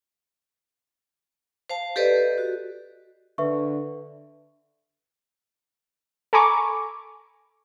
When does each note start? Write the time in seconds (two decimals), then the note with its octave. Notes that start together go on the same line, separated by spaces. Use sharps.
1.70 C5 F5 A5
1.96 G4 A4 B4 C5 D5 D#5
2.38 F#4
3.38 D3 B4 E5 C#6
6.33 A4 G#5 A#5 B5 C#6 D6